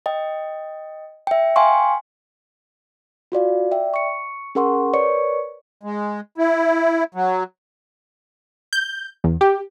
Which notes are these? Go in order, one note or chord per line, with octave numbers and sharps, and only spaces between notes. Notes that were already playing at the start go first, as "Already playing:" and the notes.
D#5 G5
E5 G5
F5 G5 G#5 C6 C#6
F4 F#4 D5 F5
D5 E5 G5
C#6 C#7
C#4 G#4 A#4 F#5 C6 C#6
A#4 B4 C#5 D5 C#6 C#7
G#3
E4
F#3
G6
E2
G4